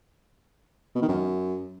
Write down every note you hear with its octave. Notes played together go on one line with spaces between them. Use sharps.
B2
D#3
F#2